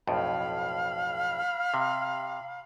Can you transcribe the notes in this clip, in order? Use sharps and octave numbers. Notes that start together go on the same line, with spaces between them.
B1 F2 A2 F5 B5
C3